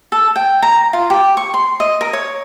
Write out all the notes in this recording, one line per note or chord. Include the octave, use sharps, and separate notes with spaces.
A4
G5
A#5
F4
G4
C#6
C6
D#5
A#4
C#5